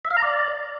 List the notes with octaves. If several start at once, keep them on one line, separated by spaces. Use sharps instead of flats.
E5
F5
A#5
D5